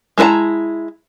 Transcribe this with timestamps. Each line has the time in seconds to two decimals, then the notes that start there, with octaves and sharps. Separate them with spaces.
0.18 G#3 E4 B4 A5 A#5